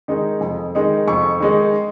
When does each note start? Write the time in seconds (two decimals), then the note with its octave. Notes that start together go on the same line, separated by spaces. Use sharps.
0.08 D#3 G#3 D#4
0.41 F2
0.75 D#3 G#3 D#4
1.07 F2 C#6
1.40 D#3 G#3 D#4